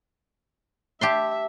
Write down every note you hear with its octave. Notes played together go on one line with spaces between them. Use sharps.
G4 E5 A5 C6